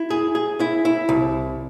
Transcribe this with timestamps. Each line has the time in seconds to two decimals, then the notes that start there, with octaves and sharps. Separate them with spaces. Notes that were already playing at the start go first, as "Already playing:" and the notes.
Already playing: E4
0.10 G#4
0.35 G#4
0.60 E4
0.85 E4
1.09 C2